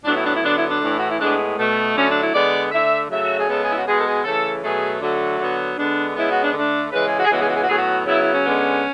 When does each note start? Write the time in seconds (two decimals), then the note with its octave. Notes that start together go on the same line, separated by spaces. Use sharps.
0.04 A2 F#3 B3 D4
0.15 E4
0.24 D4
0.33 E4
0.43 D3 F#3 B3 D4
0.56 E4
0.68 D4
0.81 A2 E3 A3
0.99 F#4
1.10 E4
1.19 A2 G#3 B3 D4
1.58 B2 A3
1.95 D3 F#3 A3 C#4
2.08 D4
2.21 E4
2.34 D3 G#3 B3 D5
2.72 D3 A3 E5
3.10 C#3 F#3 A3 E5
3.25 F#4
3.37 G#4
3.49 C#3 G#3 B3 A4
3.61 G#4
3.70 E4
3.74 F#4
3.86 B2 G#3 B3 G#4
3.96 A4
4.05 G#4
4.24 C#3 E3 A3 A4
4.63 B2 F#3 A3 G#4
5.01 D3 F#3 A3 F#4
5.39 D3 F#3 B3
5.77 D3 G#3 B3 D4
6.16 C#3 G#3 B3 E4
6.29 F#4
6.41 D4
6.53 D3 A3 D4
6.92 C#3 E3 G#3 B4
7.05 G#4
7.17 F#4
7.25 G#4
7.31 C#3 E3 G#3 B3 F#4
7.39 G#4
7.47 F#4
7.54 G#4
7.61 F#4
7.68 A2 F#3 B3 G#4
7.76 F#4
8.06 C#3 F#3 B3 E4
8.20 E4
8.33 C#4
8.44 D3 G#3 B3